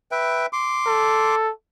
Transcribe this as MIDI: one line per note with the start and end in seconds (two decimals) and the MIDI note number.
0.11 0.46 71
0.11 0.46 76
0.11 0.46 79
0.53 1.35 84
0.53 1.35 86
0.87 1.51 69